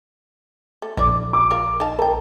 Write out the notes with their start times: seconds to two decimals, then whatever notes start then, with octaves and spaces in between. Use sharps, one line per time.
0.82 A3
0.97 A#1 D3 E4 D5
1.33 D6
1.51 F4 A#4 F5
1.80 D#4 F5 A5
1.99 A3 A#4 G5 A5